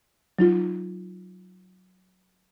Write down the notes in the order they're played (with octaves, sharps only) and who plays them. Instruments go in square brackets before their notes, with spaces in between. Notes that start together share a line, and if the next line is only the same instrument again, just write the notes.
[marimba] F#3 D#4 F4